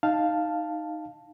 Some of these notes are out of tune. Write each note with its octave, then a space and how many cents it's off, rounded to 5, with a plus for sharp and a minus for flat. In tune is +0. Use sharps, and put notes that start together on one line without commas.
D#4 +0 F5 +0 A5 +0